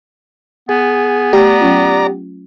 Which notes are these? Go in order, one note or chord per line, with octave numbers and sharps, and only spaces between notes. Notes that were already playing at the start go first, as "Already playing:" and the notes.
B3 G#4
A3 G4 D5 A#5
F#3 C#4 F4